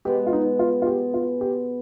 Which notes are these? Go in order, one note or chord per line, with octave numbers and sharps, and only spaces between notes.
B2 G#3 B3 G4
F4
D#4
F4
F4
G4
F4
G4